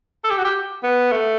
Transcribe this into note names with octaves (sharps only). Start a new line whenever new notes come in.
A4
G4
F#4
G4
B3
A3